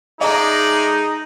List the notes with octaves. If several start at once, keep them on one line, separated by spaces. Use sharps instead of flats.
G#3 A3 D#4 G#4 D5 D#5 A#5